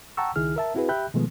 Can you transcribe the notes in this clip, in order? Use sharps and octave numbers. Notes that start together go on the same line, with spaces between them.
F#5 G5 A5 A#5 C#6 E6
C#2 D#3 E4 G#4 F6
A#4 E5 A5
C4 E4 F#4 G#4 B4
G4 E5 G5 B5 F#6 G6
B2 D#3 F3 G#3 A3 B3